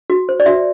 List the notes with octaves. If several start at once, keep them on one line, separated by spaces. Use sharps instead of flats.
F#4
C5
D5
F#4 E5